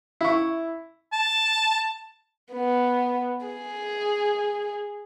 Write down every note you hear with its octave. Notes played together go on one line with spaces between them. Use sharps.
E4 C#6
A5
B3
G#4